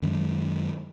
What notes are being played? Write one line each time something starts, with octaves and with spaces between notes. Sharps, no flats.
F#2 D#3 F#3 G#3